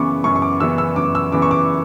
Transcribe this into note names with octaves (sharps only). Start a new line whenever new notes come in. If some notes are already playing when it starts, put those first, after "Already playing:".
Already playing: F#2 C#3 E3 B3 C#6 D6
F#2 C#6
C#6
D6
C#3 E3 B3 E6
E6
F#2 D6
E6
C#3 E3 B3 D6
C#6
D6